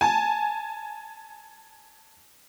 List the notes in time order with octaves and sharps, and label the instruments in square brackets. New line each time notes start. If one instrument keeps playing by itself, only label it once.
[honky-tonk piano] G#5 A5